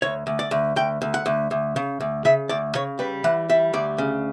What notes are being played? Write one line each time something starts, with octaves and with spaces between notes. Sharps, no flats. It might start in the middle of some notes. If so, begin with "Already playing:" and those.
D2 C#5
D2
D5
D2
D2 G5
D2
F#5
D2
D2
C#3
D2
C#3 E5
D2 D5
C#3 C#5
G3 B4
E3 F#5
G3 E5
D2 D5
C#3